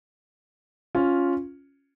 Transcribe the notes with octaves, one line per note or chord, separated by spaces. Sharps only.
C#4 F4